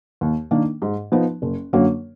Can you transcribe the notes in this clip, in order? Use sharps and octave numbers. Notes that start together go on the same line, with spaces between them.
D#2
D#3 A#3 D4
G#2
F3 B3 D#4
F#1
F#2 D3 F#3 A#3